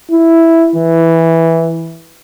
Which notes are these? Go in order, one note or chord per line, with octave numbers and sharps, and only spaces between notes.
E4
E3